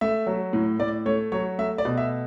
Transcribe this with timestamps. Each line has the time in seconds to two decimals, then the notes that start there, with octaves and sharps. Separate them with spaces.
0.01 A3 E5
0.27 F#3
0.53 A2
0.80 A2 D5
1.06 A3 C#5
1.32 F#3 C#5
1.58 A3 E5
1.78 D5
1.85 B2
1.98 E5